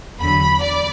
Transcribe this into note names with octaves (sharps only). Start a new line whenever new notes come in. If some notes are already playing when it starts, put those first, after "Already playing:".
E2 D3 F#3 B5
D5